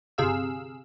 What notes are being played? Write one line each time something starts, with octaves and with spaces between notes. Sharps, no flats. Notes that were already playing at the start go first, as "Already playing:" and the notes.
G1 C3 G#4 F5 E6